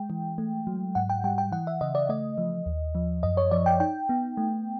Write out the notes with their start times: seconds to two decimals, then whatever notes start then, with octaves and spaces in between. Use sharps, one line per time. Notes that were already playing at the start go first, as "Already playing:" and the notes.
Already playing: G#3 G5
0.10 E3
0.38 A3
0.67 F#3
0.95 G#2 F#5
1.10 G5
1.24 G3 G5
1.38 G5
1.52 E3 F#5
1.67 E5
1.81 C#3 D#5
1.95 D5
2.09 A3 D#5
2.38 F3
2.66 D#2
2.95 F3
3.23 F#2 D#5
3.37 C#5
3.51 F3 D5
3.66 G5
3.80 D#4 G5
4.09 B3
4.37 A3